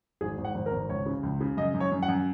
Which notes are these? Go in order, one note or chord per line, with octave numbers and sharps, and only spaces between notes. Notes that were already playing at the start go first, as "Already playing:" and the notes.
G#1 G#4
G#1
F#5
G#1
A#4
G#1
C#2 C#5
C#3
C#2
C#3
F#2 D#5
F#2
C#5
F#2
F#5
F#2